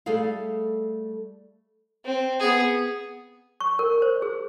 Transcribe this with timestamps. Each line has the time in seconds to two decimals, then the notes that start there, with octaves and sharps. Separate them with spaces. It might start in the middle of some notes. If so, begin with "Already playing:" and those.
0.06 G3 A3 G#4 A4 F5
2.05 C4
2.40 B3 G#4
3.60 C#6
3.79 A#4
4.02 C5
4.22 G#4